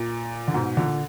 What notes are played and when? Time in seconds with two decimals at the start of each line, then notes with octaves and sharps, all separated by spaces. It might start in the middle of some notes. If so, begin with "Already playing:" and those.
Already playing: A#2
0.48 D3
0.54 G#2 B2
0.77 A#2 D3